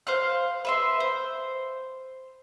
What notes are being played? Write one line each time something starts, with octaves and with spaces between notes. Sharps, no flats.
C5 F5 F#6
B4 E5 C6
C5